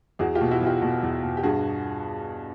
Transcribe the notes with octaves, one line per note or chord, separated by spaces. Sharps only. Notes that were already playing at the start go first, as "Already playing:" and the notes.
E2 F#4 G#4
F4 G4
B2
E4 F#4
E2
F4 G4
B2
E2
B2
G4
G2 F#4 G#4